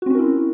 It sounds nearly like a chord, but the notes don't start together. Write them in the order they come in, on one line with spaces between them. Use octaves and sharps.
F#4 C4 C#4 A#4 E4